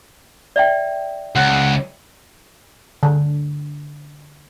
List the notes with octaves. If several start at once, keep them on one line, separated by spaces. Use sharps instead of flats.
D5 E5 G5
C#2 F#5
D3